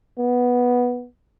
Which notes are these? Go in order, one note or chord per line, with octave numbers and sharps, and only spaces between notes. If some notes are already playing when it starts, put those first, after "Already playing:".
B3